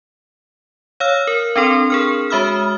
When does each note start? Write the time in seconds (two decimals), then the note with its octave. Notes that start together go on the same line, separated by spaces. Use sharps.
1.00 C#5 F5 E6 F6
1.27 A#4
1.56 C4 D4 A4 C6
1.90 G#4 A#4 F6
2.30 G#3 F#4 E5 B5 D#6 F6